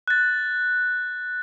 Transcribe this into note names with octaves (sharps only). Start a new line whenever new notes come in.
F#6 A6